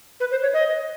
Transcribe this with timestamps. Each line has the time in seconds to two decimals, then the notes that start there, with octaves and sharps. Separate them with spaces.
0.20 B4
0.31 C5
0.42 C#5
0.53 D#5